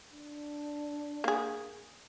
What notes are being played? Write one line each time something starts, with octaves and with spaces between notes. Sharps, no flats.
D4
A#3 G#4